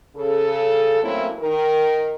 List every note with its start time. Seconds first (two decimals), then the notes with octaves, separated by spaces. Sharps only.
0.16 C#3 A4
1.02 F#3 A3 A#3 C4 C#4 E4
1.39 D#3 A#4